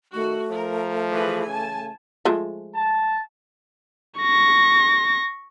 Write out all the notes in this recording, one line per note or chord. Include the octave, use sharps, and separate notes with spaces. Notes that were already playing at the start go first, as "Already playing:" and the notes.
D#3 A3 F#4
F3 A#4
E3 G#4 B4
C#3 G#5 A5
F3 G#3 A3
A5
C#6 A#6